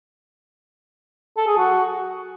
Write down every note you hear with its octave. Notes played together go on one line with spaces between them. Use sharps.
A4
G#4
F#4